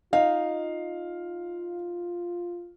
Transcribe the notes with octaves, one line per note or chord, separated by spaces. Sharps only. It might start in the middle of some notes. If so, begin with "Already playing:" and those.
D#4 F4 F5